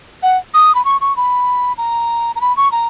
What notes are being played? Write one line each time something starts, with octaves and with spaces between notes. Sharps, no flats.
F#5
D#6
B5
C#6
C#6
B5
A#5
A#5
B5
C#6
A#5